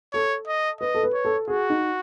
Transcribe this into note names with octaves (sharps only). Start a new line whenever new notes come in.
A4 C#5
D#5
B4 D#5
A4
B4
C#5
A4
F#4 G#4
D#4